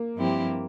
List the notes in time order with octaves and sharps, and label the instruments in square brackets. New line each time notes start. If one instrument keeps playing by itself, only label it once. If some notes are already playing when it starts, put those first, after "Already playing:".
Already playing: [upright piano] A#3
[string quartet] G2 F3 C4 E4 G4